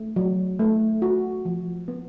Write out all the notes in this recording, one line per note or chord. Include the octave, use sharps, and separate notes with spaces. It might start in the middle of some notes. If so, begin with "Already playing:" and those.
Already playing: A3
F#3
A3
F#4
F3
B3